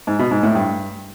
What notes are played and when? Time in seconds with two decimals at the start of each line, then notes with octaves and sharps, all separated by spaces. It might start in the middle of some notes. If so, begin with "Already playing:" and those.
0.07 G#2
0.19 B2
0.31 G#2
0.43 A2
0.55 G2